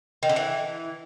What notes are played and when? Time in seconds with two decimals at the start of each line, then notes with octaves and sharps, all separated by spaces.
0.23 D#3
0.29 D3
0.36 E3